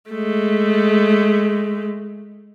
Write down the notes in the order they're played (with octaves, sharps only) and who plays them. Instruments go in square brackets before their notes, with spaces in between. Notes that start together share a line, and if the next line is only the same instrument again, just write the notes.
[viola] G#3 A3